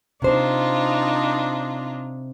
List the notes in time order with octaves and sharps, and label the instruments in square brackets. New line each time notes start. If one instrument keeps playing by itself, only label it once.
[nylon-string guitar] C3 C5 [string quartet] D4 D#4 F4